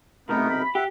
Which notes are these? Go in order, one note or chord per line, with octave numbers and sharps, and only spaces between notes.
B1 E2 C3 A3 B3 D#4 A#4
B5
G4 E5 F#5